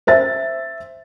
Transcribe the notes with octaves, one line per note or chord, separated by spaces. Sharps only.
C5 E5 A6